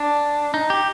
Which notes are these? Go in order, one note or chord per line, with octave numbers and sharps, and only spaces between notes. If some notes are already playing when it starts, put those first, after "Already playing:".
Already playing: D4
D#4
G4